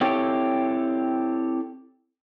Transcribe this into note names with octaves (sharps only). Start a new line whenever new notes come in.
C4 E4 G4 A4 C#5